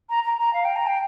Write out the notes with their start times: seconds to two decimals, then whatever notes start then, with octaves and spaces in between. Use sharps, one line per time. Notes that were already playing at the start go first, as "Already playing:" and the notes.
0.09 A#5
0.24 A#5
0.39 A#5
0.53 F5
0.64 G5
0.76 A#5
0.87 G5